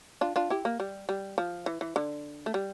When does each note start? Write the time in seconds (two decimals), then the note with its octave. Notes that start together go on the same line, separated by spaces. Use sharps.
0.21 D4 F4
0.36 D4 F4
0.50 E4 G4
0.65 A#3
0.80 G3
1.09 G3
1.38 F3
1.66 E3
1.81 E3
1.96 D3
2.46 A3
2.54 G3